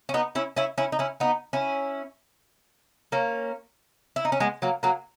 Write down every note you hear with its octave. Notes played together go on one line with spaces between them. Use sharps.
C#4
B3 D#4
C#4 E4
C#4 E4
C#4 E4
D#4
C#4 E4
B3 D#4
C#4 E4
A#3 C#4
E4
D#4
C#4
G#3 B3
F#3 A#3
F#3 A#3